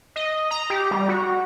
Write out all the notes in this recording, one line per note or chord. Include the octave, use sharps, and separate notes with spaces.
D#5
A#5
G4
G3
F#4